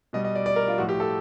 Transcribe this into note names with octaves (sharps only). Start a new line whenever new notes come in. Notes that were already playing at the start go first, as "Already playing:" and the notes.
B2 G3 D#5
D#5
D5
D5
A#4
F4
A2 F3 F#4
G4
A4